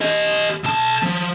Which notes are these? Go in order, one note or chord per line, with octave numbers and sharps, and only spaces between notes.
G4 D#5
B1 A5
F3